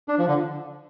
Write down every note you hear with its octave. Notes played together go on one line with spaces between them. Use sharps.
D4
F3
D3